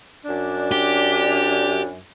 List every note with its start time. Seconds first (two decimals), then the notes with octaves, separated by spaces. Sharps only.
0.25 F#2 D4
0.72 G4